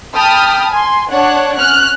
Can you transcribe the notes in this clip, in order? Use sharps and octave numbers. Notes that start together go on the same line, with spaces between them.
G5 A5 B5 D#6 F6
G#5 C6
D4 C#5 F#5 F#6
C#4 F6 F#6